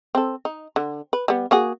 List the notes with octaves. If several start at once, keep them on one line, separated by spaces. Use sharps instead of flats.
C4 A4
D#4
D3
B4
G3 B3
A#3 F#4 G#4